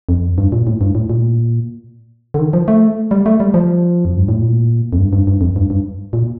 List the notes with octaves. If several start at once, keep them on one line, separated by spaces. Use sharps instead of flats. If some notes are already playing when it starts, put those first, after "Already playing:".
F2
G2
A#2
A2
G2
A2
A#2
D3
D#3
F3
A3
G3
A3
G3
F3
F2
G2
A2
A#2
F2
G2
G2
G2
F2
G2
G2
A#2